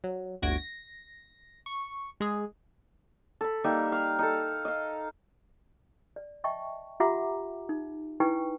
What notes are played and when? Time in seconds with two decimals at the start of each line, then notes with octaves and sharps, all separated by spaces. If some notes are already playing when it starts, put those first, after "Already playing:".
0.04 F#3
0.42 G1 D2 F#4 G#6 A#6 D7
0.58 A#6
1.66 C#6
2.20 G#3 G#4
3.41 A4 B5
3.64 G3 A#3 D#4 E5
3.92 F5
4.19 D#4 A4
4.65 D#5 F5
6.16 D5
6.44 D#5 E5 G5 A5 C#6
7.00 F4 G4 E5 F#5 A#5 D6
7.69 D#4
8.20 D#4 E4 B4 G5 G#5 C#6